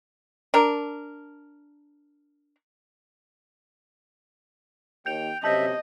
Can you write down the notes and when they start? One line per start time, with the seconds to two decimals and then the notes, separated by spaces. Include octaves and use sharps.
0.54 D4 A#4
5.06 D#2 G5 G6 F7
5.44 F#2 C3 D#5 E5 A5 G6 A#6